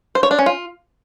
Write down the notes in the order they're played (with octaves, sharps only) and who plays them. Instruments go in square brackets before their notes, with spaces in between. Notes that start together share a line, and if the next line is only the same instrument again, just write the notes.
[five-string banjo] C5
C#5
D4
C#4
F4